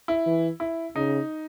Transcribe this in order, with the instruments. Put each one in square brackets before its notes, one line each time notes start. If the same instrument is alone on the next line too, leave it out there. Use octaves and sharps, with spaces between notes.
[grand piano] E4
[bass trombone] E3
[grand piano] E4
[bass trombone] C#3 [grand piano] D#4